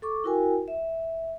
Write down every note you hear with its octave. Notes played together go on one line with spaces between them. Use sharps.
A4 C#6 D6
E4 F#4 A#4 G5 G#5
E5